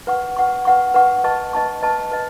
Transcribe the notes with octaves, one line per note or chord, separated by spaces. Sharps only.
B4 F#5 C#6
B4 F#5 C#6
B4 F#5 C#6
B4 F#5 C#6
B4 D#5 A5 C#6
B4 D#5 A5 C#6
B4 D#5 A5 C#6
B4 D#5